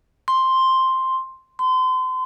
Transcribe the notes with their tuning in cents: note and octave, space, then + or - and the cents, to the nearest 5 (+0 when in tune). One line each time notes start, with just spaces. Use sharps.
C6 +5
C6 -35